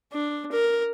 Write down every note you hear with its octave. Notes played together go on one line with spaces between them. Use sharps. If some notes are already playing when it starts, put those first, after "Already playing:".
D4
A#4